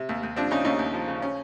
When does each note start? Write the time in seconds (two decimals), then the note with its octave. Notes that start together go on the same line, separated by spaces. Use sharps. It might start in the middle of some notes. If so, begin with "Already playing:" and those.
Already playing: C3
0.09 D#2
0.23 D#2
0.36 F3 C4 D4
0.51 C#3 C#4 D#4
0.65 D#2 C#4 D#4
0.79 D#2
0.94 F3
1.08 C#3
1.22 C#4